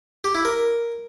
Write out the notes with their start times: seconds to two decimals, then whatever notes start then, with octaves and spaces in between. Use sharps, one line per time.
0.24 G4
0.35 E4
0.45 A#4